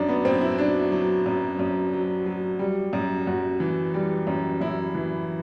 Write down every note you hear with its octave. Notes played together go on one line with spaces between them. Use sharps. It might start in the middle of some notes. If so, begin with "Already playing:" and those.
Already playing: F#2 D4
B3
F#2 C4
E4
F#3 D4
F#3
F#2
F#2
F#3
F#3
G3
F#2
F#2 F#4
E3
G3
F#2
F#2 E4
E3